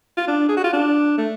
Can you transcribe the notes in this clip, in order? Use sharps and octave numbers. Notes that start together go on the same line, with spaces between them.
F4
D4
G#4
F#4
F4
D4
A3